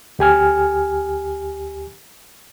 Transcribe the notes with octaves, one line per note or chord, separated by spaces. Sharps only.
D2 G4 G#5 F6